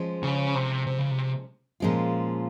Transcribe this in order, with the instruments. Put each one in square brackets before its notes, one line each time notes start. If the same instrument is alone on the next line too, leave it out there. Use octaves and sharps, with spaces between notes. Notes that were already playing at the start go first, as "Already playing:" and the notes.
Already playing: [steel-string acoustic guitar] F3 G#3 C#4
[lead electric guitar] C#3
C3
C3
C#3
C3
[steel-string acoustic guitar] A#2 F3 G#3 C#4 F4